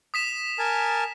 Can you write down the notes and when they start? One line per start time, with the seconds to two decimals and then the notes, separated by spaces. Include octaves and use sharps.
0.14 D#6 B6 E7
0.59 A#4 G#5 A5